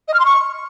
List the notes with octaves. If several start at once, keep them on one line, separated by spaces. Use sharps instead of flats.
D#5
F6
C6
C#6